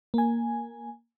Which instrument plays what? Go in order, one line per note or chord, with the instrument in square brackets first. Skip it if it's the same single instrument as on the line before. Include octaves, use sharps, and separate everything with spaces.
[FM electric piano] A#3 G#5